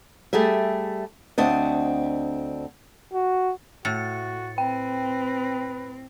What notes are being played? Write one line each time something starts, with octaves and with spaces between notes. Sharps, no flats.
G3 A3 G4 G#4 E5
D2 C4 D4 D#5
F#4
A2 F#4 A6 C#7
C4 B4 G5